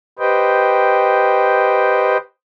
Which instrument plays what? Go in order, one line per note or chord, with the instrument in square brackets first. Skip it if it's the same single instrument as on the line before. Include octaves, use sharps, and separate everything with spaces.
[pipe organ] G4 B4 C5 D#5 G5